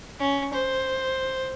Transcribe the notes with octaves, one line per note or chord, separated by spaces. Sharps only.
C#4
C5